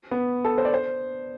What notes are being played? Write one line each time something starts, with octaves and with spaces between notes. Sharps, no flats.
B3
A4
C5
D5
C5